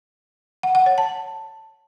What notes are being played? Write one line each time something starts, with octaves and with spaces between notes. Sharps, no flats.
F#5
F#5
C#5
A5